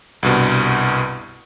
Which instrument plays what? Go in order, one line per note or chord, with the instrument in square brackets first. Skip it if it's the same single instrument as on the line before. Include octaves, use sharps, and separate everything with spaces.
[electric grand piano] C2 G2 B2